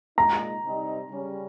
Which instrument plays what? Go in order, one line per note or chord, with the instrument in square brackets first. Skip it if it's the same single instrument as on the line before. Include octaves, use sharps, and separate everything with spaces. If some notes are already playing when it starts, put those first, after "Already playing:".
[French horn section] A#2 G#3 D#4 [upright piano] A#5
[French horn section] C3 G3 C4 D#4
C#3 G3 C#4